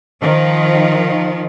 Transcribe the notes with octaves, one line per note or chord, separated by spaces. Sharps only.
D#3 F3